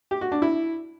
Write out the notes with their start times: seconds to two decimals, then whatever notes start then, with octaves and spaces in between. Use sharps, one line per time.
0.11 G4
0.21 F#4
0.32 D4
0.42 E4